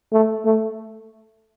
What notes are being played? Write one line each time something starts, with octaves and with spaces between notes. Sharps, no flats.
A3
A3